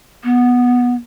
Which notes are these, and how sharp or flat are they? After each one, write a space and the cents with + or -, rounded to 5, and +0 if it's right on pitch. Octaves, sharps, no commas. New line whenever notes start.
B3 -10